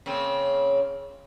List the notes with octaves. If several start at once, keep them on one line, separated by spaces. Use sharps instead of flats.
C#3 A#3 C4